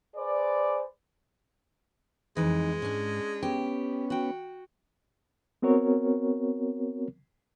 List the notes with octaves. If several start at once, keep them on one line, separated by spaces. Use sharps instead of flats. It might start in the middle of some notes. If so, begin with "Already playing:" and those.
G#4 B4 C5 D5
F2 E3 G#3 D#4
G#2 C#4 D4
B3 C#4 G4
F#4 G5
B3 C4 F#4 A#4 C#5